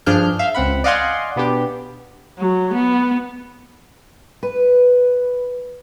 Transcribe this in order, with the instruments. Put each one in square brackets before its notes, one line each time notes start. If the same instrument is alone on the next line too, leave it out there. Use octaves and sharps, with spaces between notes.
[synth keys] G2 F3 D4 G#4 F6 G6
E5 F5
C#2 C4 F#5 B5
D5 D#5 F5 F#5 G#5 C6
B2 B3 D4 G4
[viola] F#3
B3
[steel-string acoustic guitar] B4